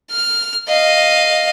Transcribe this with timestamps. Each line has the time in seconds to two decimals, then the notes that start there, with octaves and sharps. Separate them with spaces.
0.11 F6
0.68 D#5 F5